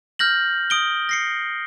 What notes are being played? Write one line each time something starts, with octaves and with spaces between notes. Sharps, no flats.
F6 G6 A#6 F#7
D#6 D7 G7
A#6 C7 C#7